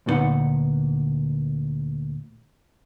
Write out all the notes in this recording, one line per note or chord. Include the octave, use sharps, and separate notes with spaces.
D2 A#2 F3 B3 D#4 F#5